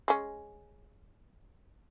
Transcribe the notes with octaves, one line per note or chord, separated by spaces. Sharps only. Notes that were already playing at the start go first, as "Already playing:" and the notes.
G#3 C#4